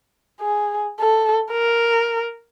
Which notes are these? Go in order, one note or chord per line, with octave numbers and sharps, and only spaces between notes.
G#4
A4
A#4